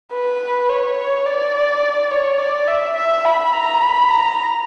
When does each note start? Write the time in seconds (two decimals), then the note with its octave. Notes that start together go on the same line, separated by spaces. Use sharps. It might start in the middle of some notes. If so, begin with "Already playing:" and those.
0.12 B4
0.69 C#5
0.97 C#5
1.26 D5
2.11 C#5
2.39 D5
2.68 E5
2.96 E5
3.25 B5
3.53 A#5
3.81 B5
4.10 A#5